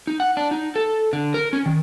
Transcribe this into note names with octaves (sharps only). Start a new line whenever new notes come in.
D#4
F#5
D4
D#4
A4
D3
A#4
C#4
D#3